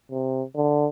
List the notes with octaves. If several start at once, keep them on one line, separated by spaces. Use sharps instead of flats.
C3
D3